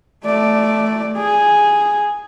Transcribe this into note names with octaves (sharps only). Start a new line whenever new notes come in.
A3 D5
G#4